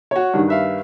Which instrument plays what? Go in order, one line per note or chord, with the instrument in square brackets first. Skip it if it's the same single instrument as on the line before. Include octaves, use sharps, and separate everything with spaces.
[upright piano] F#4 C#5
[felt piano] G2 D#3
[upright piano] B4 E5 F5